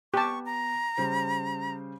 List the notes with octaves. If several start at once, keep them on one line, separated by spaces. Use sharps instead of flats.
B3 G4 A5 C#6
A#5
C#3 G3 C5